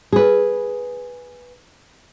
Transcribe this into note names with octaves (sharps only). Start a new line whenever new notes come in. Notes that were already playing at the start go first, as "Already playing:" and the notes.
G#4 B4